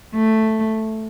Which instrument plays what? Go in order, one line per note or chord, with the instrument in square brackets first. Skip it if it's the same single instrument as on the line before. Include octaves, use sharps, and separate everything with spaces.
[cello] A3